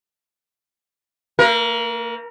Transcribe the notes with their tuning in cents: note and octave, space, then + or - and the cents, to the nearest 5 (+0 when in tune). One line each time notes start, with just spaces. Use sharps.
A#3 -35 A#4 +25